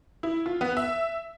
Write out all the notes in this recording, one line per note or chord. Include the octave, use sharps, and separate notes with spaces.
E4
F4
B3
E5